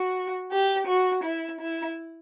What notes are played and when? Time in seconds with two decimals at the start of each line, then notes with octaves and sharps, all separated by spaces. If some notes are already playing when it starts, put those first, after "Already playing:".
Already playing: F#4
0.51 G4
0.87 F#4
1.23 E4
1.59 E4